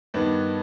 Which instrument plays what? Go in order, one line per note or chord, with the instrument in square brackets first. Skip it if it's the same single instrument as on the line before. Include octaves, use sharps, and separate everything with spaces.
[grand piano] G2 D#3 B3 D4